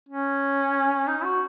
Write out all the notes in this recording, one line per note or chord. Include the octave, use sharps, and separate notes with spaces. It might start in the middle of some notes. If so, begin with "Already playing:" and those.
C#4
D#4
F#4